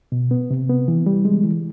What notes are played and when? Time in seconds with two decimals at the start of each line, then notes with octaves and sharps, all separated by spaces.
0.12 B2
0.31 B3
0.51 C3
0.69 B3
0.88 E3
1.06 G3
1.25 G#3
1.44 E3